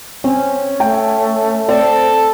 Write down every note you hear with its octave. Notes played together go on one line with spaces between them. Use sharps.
C4 C#4
A3 G5
C4 A4 D5